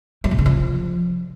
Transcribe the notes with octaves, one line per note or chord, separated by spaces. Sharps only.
F#3
A#2
C#3
F3